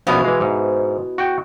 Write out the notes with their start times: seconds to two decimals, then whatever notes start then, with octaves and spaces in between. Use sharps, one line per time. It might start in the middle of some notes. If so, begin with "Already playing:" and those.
0.07 A#1 B2 B3 C#4 E4 F5
0.24 E3 G#3
0.40 G#2
1.18 F#4 G5